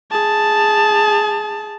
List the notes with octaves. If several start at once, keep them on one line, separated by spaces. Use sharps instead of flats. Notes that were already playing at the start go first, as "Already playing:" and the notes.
G#4 A5